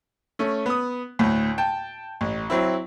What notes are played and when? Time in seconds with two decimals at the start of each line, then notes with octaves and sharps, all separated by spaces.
0.39 A3 C#4
0.66 B3 D#6
1.19 D2 A2
1.58 G5 A5
2.21 A1
2.50 F#3 C4 E4